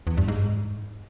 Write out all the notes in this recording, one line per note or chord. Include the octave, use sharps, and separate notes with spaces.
E2
G2
G#2